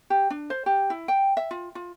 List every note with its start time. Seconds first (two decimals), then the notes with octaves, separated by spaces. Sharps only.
0.10 G4
0.30 D4
0.50 C5
0.66 G4
0.90 E4
1.08 G5
1.37 E5
1.51 F4
1.75 F4